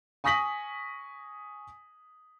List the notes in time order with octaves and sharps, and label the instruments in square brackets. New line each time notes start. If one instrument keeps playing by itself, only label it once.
[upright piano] G#5 C#6 D#6 A#6 B6 F#7